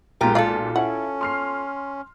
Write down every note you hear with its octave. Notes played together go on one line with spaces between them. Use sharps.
B1 A#2 G#3 F4 G4 A#4
F4 A4 D5 F5
C#4 E4 F#5
C6 F6 C7